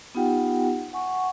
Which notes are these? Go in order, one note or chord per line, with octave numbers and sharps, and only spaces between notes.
B3 D#4 F4 G4 F#5 G5
F#5 G#5 C#6